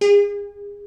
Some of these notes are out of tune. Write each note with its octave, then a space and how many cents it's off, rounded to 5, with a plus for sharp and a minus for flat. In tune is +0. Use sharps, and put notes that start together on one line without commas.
G#4 -35